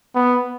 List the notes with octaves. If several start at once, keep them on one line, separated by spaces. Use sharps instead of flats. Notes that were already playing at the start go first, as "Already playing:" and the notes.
B3